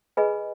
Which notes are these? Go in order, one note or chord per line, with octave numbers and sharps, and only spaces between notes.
G#4 B4 D#5 G#5 B5